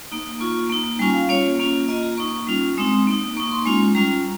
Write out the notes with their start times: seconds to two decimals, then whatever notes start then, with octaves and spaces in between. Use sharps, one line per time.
0.12 A#3 D#4
0.40 A#3 F4 C#6
0.70 A#3 D#4
0.99 G3 C#4 F4 G#5
1.14 F5
1.29 A#3 C#4 F4 C#5
1.59 A#3 C#4 F4
1.88 A#3 F4 D#5
2.03 A#5
2.18 A#3 D#4 C#6
2.47 G3 C#4 F4
2.77 G#3 C4 D#4 D#6
3.07 A#3 D#4
3.37 A#3 D#4 C#6
3.51 C6
3.66 G#3 C#4 F4
3.95 G3 C#4 F4 A#5